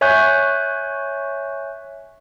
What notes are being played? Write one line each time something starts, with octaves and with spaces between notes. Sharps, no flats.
C#5 E5 G#5 C#6 F#6 G6